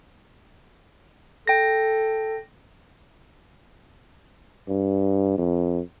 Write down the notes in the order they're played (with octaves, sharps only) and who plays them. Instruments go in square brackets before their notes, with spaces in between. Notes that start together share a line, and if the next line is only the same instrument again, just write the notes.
[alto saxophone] A4 [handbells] G5 A#6
[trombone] G2
F2